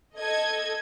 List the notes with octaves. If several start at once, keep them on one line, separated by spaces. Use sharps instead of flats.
A4 D#5 G#6